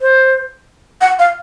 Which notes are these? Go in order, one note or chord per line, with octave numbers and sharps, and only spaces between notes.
C5
F#5
F5